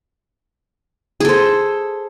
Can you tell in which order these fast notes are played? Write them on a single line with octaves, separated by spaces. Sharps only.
G#4 A4 C5